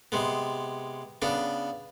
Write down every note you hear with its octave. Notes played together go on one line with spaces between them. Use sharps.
C3 G#3 B3
C#3 B3 D4